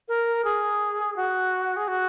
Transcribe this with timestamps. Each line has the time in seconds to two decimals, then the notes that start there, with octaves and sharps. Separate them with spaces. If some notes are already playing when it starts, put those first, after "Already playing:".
0.08 A#4
0.44 G#4
1.16 F#4
1.77 G#4
1.88 F#4